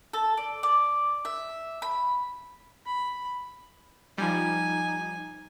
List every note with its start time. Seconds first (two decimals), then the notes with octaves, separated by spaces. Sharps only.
0.13 A4
0.37 D5
0.63 D5
1.25 E5
1.82 B5
2.86 B5
4.18 F3 G3 D#4 G#5